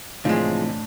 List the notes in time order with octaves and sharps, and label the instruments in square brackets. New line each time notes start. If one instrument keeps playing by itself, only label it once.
[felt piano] A2 D4 [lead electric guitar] C3 E3 [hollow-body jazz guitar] F3 G#3